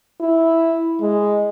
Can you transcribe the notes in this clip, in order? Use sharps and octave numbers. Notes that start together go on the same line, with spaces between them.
E4
G#3